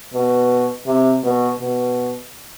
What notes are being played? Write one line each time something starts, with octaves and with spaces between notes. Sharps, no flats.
B2
C3
B2
B2